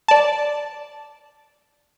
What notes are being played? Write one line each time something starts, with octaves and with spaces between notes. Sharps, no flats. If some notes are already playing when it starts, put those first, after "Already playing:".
D5 A5